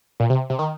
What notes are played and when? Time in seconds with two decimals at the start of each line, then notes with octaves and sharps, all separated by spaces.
0.20 A#2
0.30 C3
0.50 C3
0.59 D#3